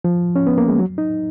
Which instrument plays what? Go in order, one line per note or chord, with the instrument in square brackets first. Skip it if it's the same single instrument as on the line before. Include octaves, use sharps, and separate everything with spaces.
[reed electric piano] F3
C#4
B3
A#3
G#3
F#3
D#4